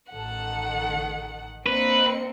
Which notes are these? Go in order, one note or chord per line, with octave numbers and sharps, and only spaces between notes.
A1 D#3 A4 F#5
A#3 C4 D4 B4 D#5 C#7